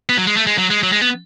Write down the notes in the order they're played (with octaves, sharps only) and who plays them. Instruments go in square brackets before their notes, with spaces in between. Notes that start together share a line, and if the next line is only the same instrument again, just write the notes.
[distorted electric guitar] B3
F#3
G#3
A3
G#3
F#3
G#3
F#3
G#3
B3